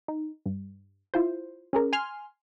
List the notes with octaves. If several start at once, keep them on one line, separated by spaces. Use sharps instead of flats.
D#4
G2
E4 F4 C5
C#4 G#4 A#4
G#5 C6 F6